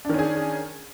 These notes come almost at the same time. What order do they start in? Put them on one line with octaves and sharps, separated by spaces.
D4 D#3 C#4 G#4